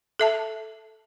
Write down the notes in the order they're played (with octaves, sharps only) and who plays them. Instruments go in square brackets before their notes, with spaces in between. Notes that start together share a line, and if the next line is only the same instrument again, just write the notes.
[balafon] A4 E5 A5